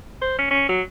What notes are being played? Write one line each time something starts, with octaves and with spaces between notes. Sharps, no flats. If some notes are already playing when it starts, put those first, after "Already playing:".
C5
C#4
C#4
F#3